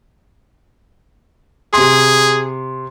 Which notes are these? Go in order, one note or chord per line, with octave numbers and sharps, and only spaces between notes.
C3 G#4 C6